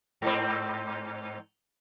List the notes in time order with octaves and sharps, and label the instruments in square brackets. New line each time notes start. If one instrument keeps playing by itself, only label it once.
[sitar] G#2 C4